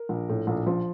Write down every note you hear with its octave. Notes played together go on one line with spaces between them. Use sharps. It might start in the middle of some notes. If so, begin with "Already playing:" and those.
Already playing: A#4
A#1
A2
A#1
F3